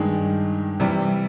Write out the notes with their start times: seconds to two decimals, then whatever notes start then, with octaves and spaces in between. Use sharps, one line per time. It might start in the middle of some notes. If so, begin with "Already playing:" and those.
Already playing: G2 D#3 G#3
0.80 C3 E3 G3